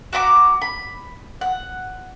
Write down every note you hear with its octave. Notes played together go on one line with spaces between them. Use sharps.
F#4 A#5 B5 D6
B5
F#5